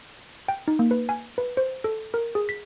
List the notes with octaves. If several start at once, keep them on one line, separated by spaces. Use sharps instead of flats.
G5
D#4
A#3
B4
G#5
B4
C5
A4
A#4
G#4
B6